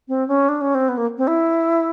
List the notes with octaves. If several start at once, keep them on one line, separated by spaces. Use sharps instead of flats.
C4
C#4
D4
C#4
C4
B3
A#3
C4
E4